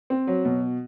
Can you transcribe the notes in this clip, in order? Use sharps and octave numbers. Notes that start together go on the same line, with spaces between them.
C4
F#3
B2